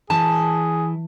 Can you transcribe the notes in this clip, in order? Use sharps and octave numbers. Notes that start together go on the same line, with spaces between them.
E3 G#4 A5